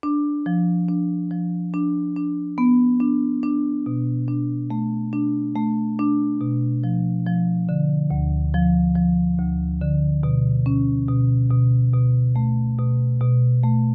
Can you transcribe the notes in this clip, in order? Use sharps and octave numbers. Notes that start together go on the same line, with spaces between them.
D4
F3
D4
F3
D4
D4
B3
D4
D4
B2
D4
A3
D4
A3
D4
B2
F3
F3
D3
D2
F3
F3
D2
D3
B2
C#4
B2
B2
B2
A3
B2
B2
A3